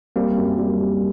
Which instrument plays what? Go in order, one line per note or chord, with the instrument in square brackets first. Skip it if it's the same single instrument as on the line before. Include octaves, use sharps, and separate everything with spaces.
[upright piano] G3 [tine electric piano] A#3 C4
[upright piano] F#2
G3
G3